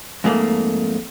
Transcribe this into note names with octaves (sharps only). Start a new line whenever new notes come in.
F2 G#2 A3 A#3